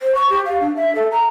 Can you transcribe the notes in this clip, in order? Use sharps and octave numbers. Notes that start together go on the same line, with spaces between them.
C5
C#6
G4
F5
D4
E5
A4
A#5